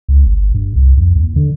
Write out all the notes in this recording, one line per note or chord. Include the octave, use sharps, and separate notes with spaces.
C#2
G1
G2
C2
F2
D#2
D3